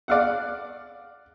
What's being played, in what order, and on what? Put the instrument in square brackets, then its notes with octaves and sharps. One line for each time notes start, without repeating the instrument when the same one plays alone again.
[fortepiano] D5 F5 F#5